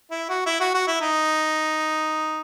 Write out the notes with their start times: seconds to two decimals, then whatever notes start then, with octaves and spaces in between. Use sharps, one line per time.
0.11 E4
0.29 F#4
0.46 E4
0.60 F#4
0.74 F#4
0.87 E4
1.01 D#4